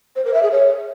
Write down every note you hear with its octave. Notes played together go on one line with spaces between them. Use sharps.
C5
A#4
E5
G#4
C#5